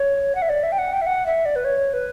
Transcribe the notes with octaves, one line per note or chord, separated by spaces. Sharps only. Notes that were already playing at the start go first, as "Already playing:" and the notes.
Already playing: C#5
F#5
E5
D5
E5
G5
F#5
G5
E5
F#5
E5
D5
B4
C#5
B4